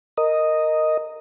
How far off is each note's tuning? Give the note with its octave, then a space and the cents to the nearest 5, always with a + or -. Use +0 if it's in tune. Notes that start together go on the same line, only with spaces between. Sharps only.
A#4 -10 D#5 +0